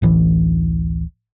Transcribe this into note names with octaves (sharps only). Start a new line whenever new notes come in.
D1 A1 E3